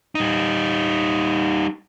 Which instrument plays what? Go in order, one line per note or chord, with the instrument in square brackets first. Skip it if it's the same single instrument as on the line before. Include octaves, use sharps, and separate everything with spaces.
[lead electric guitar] G3 D#4